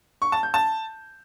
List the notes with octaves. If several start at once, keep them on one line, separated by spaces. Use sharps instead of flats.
C#6
A5
G6
A5